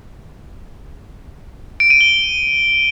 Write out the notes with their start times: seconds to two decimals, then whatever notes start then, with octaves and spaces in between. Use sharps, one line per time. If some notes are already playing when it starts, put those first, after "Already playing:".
1.80 D7
1.90 D#7
2.01 G7